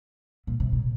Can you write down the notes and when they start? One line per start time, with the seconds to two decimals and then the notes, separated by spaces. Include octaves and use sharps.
0.47 A#2
0.60 C3
0.72 A#2